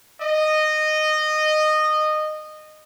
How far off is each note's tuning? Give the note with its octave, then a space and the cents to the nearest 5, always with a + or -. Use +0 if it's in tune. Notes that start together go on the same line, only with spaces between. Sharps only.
D#5 -15